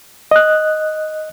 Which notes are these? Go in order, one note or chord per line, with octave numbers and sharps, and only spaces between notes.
D#5 F#6